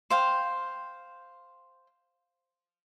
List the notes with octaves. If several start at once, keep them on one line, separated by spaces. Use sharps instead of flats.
C5 F5 G5